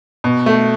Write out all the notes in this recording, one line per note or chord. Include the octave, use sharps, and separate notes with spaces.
B2
A3